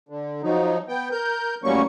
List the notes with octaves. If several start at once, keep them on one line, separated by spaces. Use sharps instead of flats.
D3
F3 F#3 D#4
B3 G5
A#4 G6
A2 F#3 G3 A#3 C#4 C#6